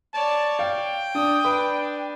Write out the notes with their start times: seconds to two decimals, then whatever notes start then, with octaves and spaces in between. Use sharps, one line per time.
0.14 C#5 D5 A5
0.59 F5 G5
1.15 D4 D#6
1.45 D4 B4